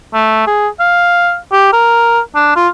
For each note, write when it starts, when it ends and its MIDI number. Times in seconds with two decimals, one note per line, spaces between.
0.14 0.46 57
0.47 0.68 68
0.80 1.37 77
1.53 1.71 67
1.73 2.20 70
2.35 2.54 62
2.56 2.68 65